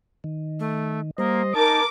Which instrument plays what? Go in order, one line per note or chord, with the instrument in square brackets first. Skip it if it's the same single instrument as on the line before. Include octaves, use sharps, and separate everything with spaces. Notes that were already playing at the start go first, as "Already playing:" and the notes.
[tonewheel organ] D#3
[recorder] A3
[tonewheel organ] G3 C5 [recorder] A#3 [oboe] D#5
[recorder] D#4 [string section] A#4 D6 [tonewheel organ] G#5 [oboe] A5